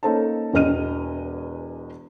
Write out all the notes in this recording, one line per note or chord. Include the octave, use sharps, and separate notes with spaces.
A#3 C#4 D#4 A4 C5 A5
E1 E2 D#5 F6 D#7